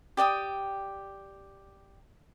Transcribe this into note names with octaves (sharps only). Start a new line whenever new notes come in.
G4 D5 G5 D#6